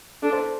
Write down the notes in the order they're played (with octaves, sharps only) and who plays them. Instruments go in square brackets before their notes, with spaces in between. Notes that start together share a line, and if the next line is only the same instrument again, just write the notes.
[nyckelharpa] D4 [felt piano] A4
[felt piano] C5